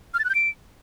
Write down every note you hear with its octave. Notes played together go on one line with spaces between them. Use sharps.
F6
A6
F#6
G6
D7